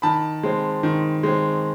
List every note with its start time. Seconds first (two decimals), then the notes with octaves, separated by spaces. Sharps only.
0.02 D#3 A5 B5
0.43 G#3 C4
0.83 D#3
1.23 G#3 C4